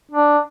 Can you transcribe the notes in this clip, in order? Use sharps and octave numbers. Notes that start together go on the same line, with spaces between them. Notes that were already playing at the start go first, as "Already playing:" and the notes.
D4